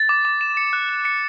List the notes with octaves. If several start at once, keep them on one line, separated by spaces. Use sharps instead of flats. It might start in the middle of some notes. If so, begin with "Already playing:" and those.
Already playing: A6
D6
D6
E7
C#7
F#6
F#6
C#7